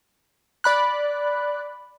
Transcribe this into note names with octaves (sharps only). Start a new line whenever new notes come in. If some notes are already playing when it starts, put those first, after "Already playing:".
D5 B5 F#6